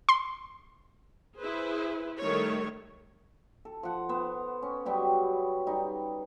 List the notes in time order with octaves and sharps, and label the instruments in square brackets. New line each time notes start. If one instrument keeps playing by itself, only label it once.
[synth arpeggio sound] C6
[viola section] E4 G#4 B4 C5
D#3 G3 A3 C#5
[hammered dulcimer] A4
F3 F#5
B3 C5
C#4
F#3 G3 B3 G4
G3 D#4